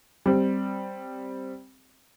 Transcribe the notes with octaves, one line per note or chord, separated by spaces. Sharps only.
G3 C4